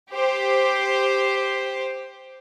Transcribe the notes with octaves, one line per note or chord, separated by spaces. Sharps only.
G4 C5